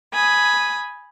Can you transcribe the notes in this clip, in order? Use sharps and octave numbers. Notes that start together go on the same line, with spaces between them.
G#5 B5 D#6